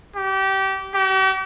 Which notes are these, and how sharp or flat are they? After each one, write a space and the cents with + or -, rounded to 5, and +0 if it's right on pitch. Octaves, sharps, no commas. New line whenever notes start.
G4 -25
G4 -45